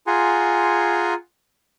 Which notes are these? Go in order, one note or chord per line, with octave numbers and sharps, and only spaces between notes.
F4 G#4 F#5 G#5 A#5 C6